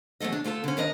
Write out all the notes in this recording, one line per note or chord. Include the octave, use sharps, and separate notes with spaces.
E2 F#3 A3 A4 D#5
D4
D2 A3 F4 A4
D3 C#4
D#3 F3 D4 A#4 D#5